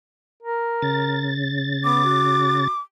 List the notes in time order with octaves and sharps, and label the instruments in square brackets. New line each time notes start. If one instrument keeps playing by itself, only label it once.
[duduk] A#4
[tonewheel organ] C#3 A6
[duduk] B3 [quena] D6
[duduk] F#4